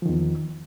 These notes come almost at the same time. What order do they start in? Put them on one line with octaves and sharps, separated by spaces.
F3 D#3 E2